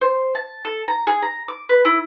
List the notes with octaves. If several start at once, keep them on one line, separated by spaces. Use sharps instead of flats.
C5
A5
A4
A#5
G#4
A#5
D6
B4
E4